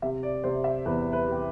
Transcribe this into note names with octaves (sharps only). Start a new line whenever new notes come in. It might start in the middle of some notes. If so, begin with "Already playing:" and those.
C3 E5
D5
C3 C5
E5
E2 B4
B4
C3 G4